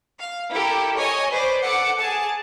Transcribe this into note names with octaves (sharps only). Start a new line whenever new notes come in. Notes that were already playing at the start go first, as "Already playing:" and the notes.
F5
E4 G4 A4 A#4
C#5 D#5 G#5
B4 C5 D5
A4 F#5 D6 C#7
G#4 A5